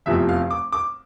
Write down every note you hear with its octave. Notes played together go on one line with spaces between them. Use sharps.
F1 E2 C3 F3 E5
F5
D6
D6